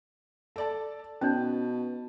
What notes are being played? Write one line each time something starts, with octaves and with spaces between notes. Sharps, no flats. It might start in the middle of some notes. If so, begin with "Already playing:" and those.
A4 D5 A5
B2 C#4 D#4 C#5 A5